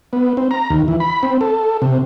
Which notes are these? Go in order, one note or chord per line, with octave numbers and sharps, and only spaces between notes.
B3
C4
A#5
D#2
E3
B5
C4
A4
C3